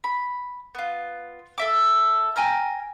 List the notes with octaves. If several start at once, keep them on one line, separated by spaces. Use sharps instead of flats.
B5
B3 F4
A4 E5 D6
G5 G#5 A#5 F6